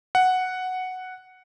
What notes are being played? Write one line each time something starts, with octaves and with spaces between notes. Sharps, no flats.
F#5